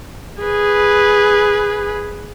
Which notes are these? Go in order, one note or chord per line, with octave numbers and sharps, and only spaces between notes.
G#4 B4